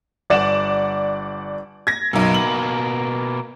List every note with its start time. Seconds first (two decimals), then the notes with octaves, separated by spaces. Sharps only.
0.30 G1 D5 F#5 E7
1.87 G#6 A#6
2.13 B1 F#2 B2 A#3
2.34 F#7